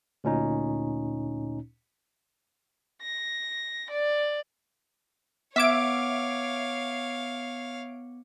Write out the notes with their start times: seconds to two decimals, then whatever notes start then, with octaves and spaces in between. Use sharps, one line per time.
0.24 D2 A#2 C#4 D#4
3.02 A#6
3.90 D5
5.56 B3 C#5 E5 F5 D6 G#6 D7